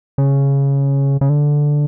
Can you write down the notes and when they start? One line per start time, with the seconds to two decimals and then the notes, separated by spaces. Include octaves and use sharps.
0.18 C#3
1.21 C#3
1.29 D3